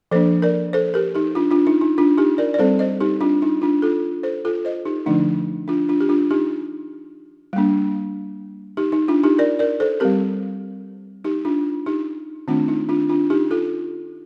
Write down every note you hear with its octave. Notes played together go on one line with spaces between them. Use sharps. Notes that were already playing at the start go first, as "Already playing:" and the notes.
F3 A#3 D4 A4 C5
A#4 D5
A4 C5
G4 A#4
D#4 G4
D4 F4
D4 F4
D#4
D#4
D4 F4
D#4 G4
A#4 D5
D5
G3 C4 A4 C5
C5 D#5
D#4 G4
D4 F4
D#4
D4 F4
F4 A4
A4 C5
F4 A4
C5 D#5
D#4 G4
D3 F3 A3 D4 D#4
D4 F4
D4 F4
G4
D4 F4
D#4 G4
G3 A#3 D4
D#4 G4
D#4
D4 F4
D#4 G4
A#4 D5
A#4 D5
A4 C5
G3 C4 G4 A#4
D#4 G4
D4 F4
D#4 G4
D#3 A3 C4 D4 F4
D#4
D4 F4
D4 F4
D#4 G4
F4 A4